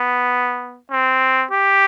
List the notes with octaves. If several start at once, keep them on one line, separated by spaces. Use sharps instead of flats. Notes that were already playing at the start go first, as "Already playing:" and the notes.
Already playing: B3
C4
G4